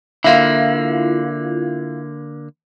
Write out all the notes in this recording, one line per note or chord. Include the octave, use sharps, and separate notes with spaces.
D3 A#3 E4 F4